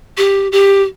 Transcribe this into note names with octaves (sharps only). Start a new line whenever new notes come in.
G4
G4